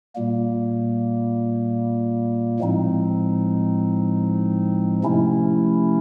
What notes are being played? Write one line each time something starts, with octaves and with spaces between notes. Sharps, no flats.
A#2 G3 A#3
A2 F3 G#3 C4 D#4
C3 F3 A3 C#4 E4